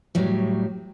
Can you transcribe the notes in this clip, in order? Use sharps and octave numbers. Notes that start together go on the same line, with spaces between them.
A2 F#3 G3